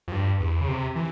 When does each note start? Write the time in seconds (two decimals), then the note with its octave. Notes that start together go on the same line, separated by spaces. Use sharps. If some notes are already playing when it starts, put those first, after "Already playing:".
0.08 F2
0.12 G2
0.40 E2
0.61 C#3
0.68 C3
0.96 E3